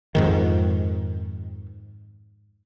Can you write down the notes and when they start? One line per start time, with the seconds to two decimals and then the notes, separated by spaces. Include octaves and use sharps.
0.15 F2 G#2 D#3